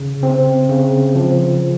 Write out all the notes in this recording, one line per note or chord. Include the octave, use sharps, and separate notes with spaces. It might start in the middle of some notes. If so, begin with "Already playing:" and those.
Already playing: C#3
C4
C#3
F3